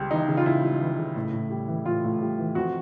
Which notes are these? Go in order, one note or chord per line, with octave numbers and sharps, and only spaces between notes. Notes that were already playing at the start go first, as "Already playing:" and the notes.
Already playing: C#2 G3
E3 D#4
C#3
F4
C#2 E4
G3
E3
C#3
A2
A2
G3
E3
A2 F4
A2
G3
E3
F2 F#4